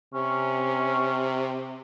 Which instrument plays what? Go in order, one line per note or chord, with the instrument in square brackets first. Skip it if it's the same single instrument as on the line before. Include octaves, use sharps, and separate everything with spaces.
[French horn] C3 [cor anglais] C#4